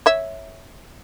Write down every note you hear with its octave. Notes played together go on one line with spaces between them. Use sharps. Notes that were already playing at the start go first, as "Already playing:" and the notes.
C#5 E5